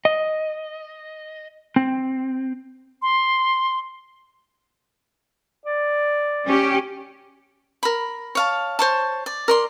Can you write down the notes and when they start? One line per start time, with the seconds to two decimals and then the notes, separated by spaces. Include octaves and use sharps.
0.05 D#5
1.76 C4
3.02 C6
5.66 D5
6.47 C#4 G4
7.83 A#4 B5
8.35 C#5 F5 A5
8.79 C5 C#5 A5
9.26 D5
9.48 A#4 D5 C6